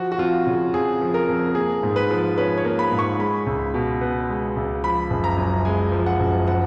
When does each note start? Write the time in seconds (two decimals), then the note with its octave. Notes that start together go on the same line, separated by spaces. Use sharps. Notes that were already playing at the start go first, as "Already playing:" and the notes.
Already playing: F3 F#4
0.12 F#4
0.18 F2 F4
0.46 C#3 F4
0.73 F2 G#4
1.01 F3
1.14 A#4
1.29 F2
1.55 A#3 G#4
1.83 G#2
1.96 B4
2.11 F3
2.38 C#4 B4
2.58 C#5
2.65 A#3
2.79 B5
2.92 G#2
2.99 C#6
3.19 G#3 B5
3.47 C#2
3.74 B2
4.01 B3
4.29 G#3
4.57 C#2
4.83 F3 B5
5.10 F#1
5.24 A#5
5.38 F#2
5.65 G#3 G#5
5.92 F3
6.06 F#5
6.20 F#1
6.47 F3 F#5